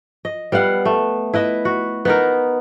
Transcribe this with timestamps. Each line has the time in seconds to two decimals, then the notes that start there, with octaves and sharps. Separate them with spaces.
0.25 D#5
0.52 G3 B3 F5 F#5
0.85 A3
1.34 E4 B4 D#5 E5
1.65 F#4
2.05 B3 D#4 A#4